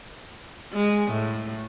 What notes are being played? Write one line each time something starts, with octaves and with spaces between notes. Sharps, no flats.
G#3
A2